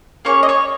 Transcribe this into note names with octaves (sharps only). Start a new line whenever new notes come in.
A#3 C#4 G#4 C#5
D#5
C#5